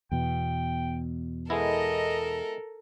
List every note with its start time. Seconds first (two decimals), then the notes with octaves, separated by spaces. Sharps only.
0.12 E2 B2 G5
1.50 G#3 B3 E4 A4 A#4 D#5